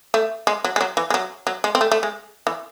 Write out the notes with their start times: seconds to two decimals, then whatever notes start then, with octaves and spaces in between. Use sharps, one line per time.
0.14 A3
0.47 G#3
0.64 F#3
0.76 G#3
0.81 F#3
0.97 E3
1.10 G#3
1.14 F#3
1.47 F#3
1.64 G#3
1.75 C4
1.81 A3
1.92 A3
2.03 G#3
2.47 E3